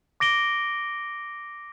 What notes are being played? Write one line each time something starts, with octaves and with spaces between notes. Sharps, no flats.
D6 A#6 D7 G7